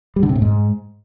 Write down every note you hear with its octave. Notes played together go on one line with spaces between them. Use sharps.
G3
D3
C3
A2
G#2